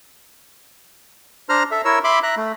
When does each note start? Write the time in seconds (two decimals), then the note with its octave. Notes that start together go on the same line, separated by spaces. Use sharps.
1.49 D4 C5 A#5 F6
1.71 A4 E5
1.85 E4 A#4 C#5 E6
2.04 E5 B5 C6 D6
2.23 E5 A#5 F#6
2.37 A3